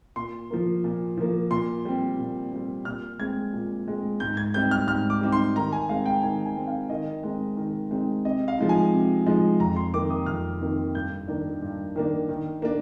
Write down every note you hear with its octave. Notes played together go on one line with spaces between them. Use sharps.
A#2 C6
F3 A#3
A#2
F3 A#3
A#2 C6
G3 C4
A#2
G3 C4
A#2 F6
G#3 C4 G#6
A#2
G#3 C4
G#2 G6
G#6
G3 C4 D#4 G6
F6
G#2 F6
D6
G3 C4 D#4
C6
D#3 A#5
G#5
G#3 C4 F5
G5
D#3 G#5
G#5
G#3 C4
F5
D#3 D#5
G#3 C4 D#4
D#3
G#3 C4 D#4
C3 D#5
F5
F3 G#3 D#4
G#5
C3
F3 G#3 D#4
F2 A#5
C6
C3 D#3 A#3 D#4 D6
D#6
F2 F6
C3 D#3 A#3 D#4
G2 G6
D#3 A#3 D4
G2
D#3 A#3 D4
D#3
A#3 D4